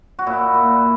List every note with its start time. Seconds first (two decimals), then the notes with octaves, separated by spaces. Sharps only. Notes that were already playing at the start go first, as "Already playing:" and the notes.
0.19 F#4
0.27 A#2 E4
0.54 A#2